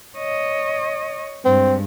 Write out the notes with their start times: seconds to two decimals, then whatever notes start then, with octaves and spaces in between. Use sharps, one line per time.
0.17 C#5 D#5
1.45 G2 G#3 C4